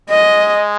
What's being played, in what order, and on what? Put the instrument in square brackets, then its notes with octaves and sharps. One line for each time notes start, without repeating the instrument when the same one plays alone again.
[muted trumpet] G#3 [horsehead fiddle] D#5